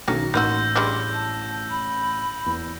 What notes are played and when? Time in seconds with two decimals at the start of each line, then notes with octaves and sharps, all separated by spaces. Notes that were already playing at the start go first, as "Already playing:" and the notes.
0.08 B1 D#3 F#3 C#4 A4 A#6
0.34 A1 A#3 D#4 F#4 C6 E6 G6
0.75 G3 G#3 D4 C6
1.13 A5
1.70 B5
2.46 E2